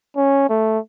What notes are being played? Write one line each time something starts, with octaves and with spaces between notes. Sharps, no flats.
C#4
A3